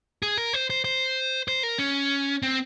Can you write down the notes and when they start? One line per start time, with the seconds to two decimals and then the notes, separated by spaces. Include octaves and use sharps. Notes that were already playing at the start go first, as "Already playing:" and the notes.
0.23 G#4
0.38 A#4
0.53 C5
0.70 C5
0.84 C5
1.48 C5
1.63 A#4
1.79 C#4
2.42 C4